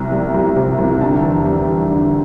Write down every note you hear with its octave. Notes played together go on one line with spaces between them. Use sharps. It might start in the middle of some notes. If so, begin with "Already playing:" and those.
Already playing: C2 C3
G3
C2
C3
C2
D3 A5
E2
G3
E2
D3